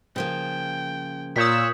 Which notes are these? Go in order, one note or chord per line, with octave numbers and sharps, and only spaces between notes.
C#3 F3 A#3 G5
A#2 C#5 D#6 E6 F#6 G6 B6